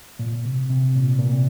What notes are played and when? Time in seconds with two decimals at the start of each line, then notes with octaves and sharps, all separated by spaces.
0.19 A#2
0.45 C3
0.70 C3
0.95 A#2
1.19 A#2
1.32 C3